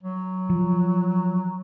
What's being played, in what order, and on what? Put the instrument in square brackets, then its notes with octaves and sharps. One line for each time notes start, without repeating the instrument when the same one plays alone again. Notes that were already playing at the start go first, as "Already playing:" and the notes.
[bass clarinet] F#3
[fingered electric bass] F3